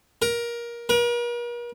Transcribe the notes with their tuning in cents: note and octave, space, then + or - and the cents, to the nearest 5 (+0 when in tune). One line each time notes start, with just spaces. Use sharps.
A#4 +20
A#4 +45